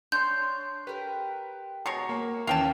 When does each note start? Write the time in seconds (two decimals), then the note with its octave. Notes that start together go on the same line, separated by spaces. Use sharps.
0.12 D4 C#5 C6 G6
0.87 G4 A#4 B4
1.86 B2 G#3 C#5 A#5 C7 C#7
2.09 A#3
2.47 D#2 E3 C#4 E5 F5 G5 A5